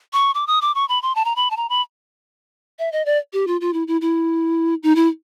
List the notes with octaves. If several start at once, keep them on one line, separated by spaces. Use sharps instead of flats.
C#6
D6
D#6
D6
C#6
B5
C6
A5
A#5
B5
A5
A#5
B5
E5
D#5
D5
G4
F4
F4
E4
E4
E4
D#4
E4